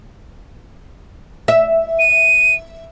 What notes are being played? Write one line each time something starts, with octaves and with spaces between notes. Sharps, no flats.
E5
D#7